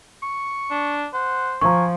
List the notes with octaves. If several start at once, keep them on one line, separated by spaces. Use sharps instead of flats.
C#6
D4
C5 F#5
F3 G#5 A#5 C#6